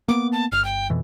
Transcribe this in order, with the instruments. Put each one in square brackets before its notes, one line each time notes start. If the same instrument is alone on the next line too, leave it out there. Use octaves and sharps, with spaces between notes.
[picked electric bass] A#3 B3 [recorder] D6
[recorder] A5
[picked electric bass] G1 [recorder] F6
[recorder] G5
[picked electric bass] F2 B2 E3